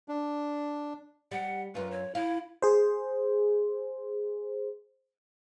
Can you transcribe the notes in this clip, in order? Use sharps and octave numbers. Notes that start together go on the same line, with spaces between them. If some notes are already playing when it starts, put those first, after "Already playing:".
D4
G3 F#5
F#2 F4 B4
C#5
E4 F5
G#4 C5